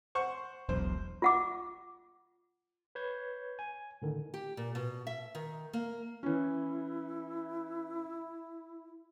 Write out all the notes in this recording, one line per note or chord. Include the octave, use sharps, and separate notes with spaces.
C5 F#5 C#6
E1 B1 C5
F4 F#5 D6
B4 C#5 G6 G#6
G#5
A2 D3 D#3
G4
A#2
B2
E5
D#3
A#3
E3 C#4 E4